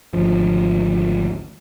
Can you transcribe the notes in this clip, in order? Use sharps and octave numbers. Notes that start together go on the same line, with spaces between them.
G#1 D2 F3